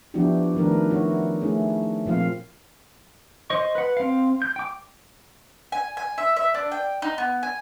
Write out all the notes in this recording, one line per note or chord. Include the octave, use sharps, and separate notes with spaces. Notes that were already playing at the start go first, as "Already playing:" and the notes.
F3 B3 D4 E4 F#4 G4
D#3 F3 A3 D4 A#4 B4
E4 F#4 C#5
A3 C#4 E4 G#4
A#2 F3 A#3 C4 F4 F5
C5 D#5 C#6
B4 F#5
C4 F5
G6
G5 D6
G#5
G#5
E5
E5
D4
G5
D#4
B3
G#5